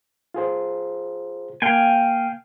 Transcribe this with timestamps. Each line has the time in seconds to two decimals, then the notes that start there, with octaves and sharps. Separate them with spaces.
0.34 F4 G#4 C5
1.62 A#3 F5 G5 G#5